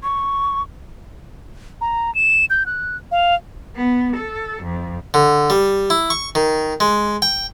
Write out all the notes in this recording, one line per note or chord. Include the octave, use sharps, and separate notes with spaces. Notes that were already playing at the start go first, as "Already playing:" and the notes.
C#6
A#5
E7
G6
F#6
F5
B3
A4
F2
D3
G3
E4
C#6
D#3
G#3
G5